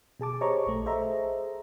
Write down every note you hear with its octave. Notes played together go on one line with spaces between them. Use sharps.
B2 G#4 A5 D6
G4 C5 C#5 D#5 A#5 C#6
A#1 A3
G#4 A4 C5 D#5 E5 A#5